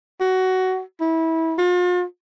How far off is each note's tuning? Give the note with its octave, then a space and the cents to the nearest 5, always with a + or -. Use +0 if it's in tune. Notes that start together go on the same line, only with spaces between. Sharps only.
F#4 +15
E4 -25
F4 +40